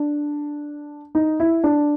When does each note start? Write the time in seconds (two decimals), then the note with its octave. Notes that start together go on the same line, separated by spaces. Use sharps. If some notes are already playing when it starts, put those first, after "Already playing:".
Already playing: D4
1.15 D#4
1.40 E4
1.64 D4